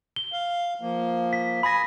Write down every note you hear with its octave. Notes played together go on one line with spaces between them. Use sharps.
G7
F5
F3 A#3
B6
G#5 B5 D#6 A#6